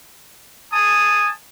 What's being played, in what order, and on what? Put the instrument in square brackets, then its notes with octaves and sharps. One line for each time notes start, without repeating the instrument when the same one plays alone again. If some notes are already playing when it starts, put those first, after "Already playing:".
[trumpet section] G#5 A5 D#6